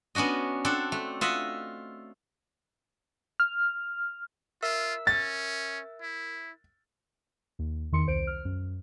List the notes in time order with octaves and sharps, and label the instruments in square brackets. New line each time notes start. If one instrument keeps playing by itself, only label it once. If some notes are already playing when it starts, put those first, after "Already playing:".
[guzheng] B3 C#4 D4 F#4 D#5
C4 D4 A4 F#5
A3
F4 D#5 E5 F#5
[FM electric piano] F6
[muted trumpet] F4 [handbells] A#4 E5 E6
[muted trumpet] C#4 [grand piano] A6
[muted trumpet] E4
[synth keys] D#2
E2 D#3 C6 C#7
C2 C5 D7
F6
F#2